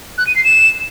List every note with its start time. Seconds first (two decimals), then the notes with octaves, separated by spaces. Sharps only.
0.18 F#6
0.27 D#7
0.36 C7
0.44 E7